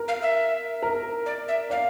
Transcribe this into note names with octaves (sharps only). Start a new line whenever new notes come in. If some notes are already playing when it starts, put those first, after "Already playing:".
Already playing: A#4
F5
E5
A#4
D5
E5
D5 F5